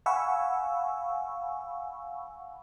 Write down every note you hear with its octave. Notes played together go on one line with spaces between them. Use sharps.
F5 F#5 G#5 B5 C#6 E6